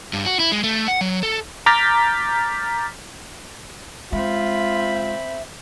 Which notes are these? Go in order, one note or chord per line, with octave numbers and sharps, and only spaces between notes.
G2
F#4
E4
G#3
A3
F#5
F#3
A4
A#5 D6 F6 G6 A6 B6
G#3 C4 F4 E5 B5